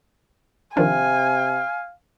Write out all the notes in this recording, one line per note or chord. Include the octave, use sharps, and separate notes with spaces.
C3 D#3 F3 D4 F5 G#5